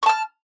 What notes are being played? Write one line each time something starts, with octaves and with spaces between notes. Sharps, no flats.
A5 C#6 F6